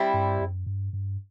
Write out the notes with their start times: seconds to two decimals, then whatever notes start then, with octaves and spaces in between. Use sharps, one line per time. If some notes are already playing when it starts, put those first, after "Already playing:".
Already playing: G3 C4 E4
0.14 G2
0.40 F#2
0.66 G2
0.93 G2